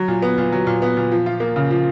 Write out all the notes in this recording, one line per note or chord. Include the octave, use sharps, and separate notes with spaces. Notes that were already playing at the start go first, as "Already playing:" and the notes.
Already playing: F#3
A#2
B3
A#2
F#3
A#2
B3
A#2
F3
F4
A#3
C#3
F3